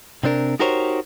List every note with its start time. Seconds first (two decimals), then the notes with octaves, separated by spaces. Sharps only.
0.23 C3 C4 D4 A#4
0.60 D#4 F#4 G4 A#4 C5 C#5